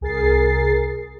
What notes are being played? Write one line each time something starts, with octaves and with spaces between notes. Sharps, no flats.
C2 G#4 A#4 A6 C7